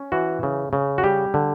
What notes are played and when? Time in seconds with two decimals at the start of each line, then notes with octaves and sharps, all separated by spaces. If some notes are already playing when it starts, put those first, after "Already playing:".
Already playing: C#4
0.12 E3 F#4
0.43 C#3
0.73 C#3
0.98 F#4
1.03 G3 G4
1.34 D3